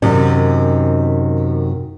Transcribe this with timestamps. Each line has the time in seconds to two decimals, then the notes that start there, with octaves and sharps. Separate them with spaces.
0.02 F#2 C3 D#3